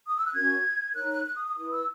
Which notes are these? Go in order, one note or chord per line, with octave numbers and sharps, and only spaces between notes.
D#6
E6
F#6
C#4 F#4 A#4 G#6
D#4 A#4 C#5 F#6
F#6
F#6
D#6
D#6
E4 B4 D#6
E6